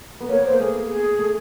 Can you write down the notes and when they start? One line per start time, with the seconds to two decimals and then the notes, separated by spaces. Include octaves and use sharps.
0.20 B3
0.29 A#3 C#5
0.39 B3
0.45 A#3 C5
0.59 A3 G#4
0.89 G#4
1.18 A3